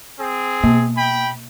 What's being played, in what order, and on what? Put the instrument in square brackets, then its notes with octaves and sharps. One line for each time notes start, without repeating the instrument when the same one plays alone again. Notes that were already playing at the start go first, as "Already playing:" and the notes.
[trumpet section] C4 G#4
[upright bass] B2 [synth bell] A#3
[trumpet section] G5 B5